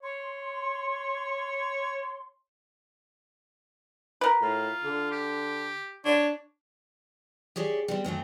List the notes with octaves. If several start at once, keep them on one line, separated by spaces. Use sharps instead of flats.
C#5 C6
A#4 B4
A2 F4
D3
G4
D4 C#5
G4 G#4 C#5 D5 E5
G3 B3 C4
F#2 F#3 A3 C4